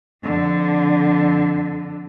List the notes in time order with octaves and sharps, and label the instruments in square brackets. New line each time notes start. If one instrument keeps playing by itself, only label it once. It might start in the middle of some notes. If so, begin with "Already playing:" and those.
[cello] F2 D3